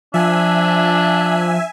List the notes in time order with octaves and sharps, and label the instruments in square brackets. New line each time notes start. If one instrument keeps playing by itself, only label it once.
[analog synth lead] F3 [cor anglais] D4 [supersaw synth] E5 G#5